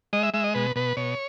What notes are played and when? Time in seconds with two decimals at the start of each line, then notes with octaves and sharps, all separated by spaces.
0.13 G#3 D#5
0.23 E5
0.34 G#3 E5
0.44 D#5
0.54 B2 B4
0.76 B2 B4
0.97 B2 C#5